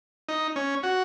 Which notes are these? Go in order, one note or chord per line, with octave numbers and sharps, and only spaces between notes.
D#4
C#4
F#4